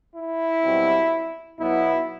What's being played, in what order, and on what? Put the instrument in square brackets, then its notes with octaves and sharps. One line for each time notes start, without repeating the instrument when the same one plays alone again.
[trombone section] E4
B1 B2 G3 C4
B1 B2 F#3 B3 E4